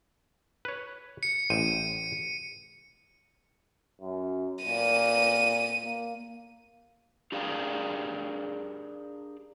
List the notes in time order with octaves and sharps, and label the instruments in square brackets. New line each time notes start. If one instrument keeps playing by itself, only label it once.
[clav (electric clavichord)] B4 C#5
[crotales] C#7
[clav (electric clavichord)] A1 A2 C5 [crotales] D#7
[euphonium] F#2
[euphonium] A#2 [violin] D#7
[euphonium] A#3
[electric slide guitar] D4 G4 G#4 A#4 D5 F5